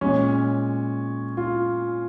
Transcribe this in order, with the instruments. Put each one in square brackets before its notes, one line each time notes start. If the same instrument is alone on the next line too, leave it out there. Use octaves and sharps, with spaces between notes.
[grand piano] A#2 G#3 C#4
F4